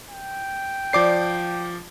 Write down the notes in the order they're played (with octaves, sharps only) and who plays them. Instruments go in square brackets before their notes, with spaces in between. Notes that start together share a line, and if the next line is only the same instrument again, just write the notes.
[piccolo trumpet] G5
[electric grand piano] F3 D6 C7 [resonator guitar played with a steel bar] C5 D5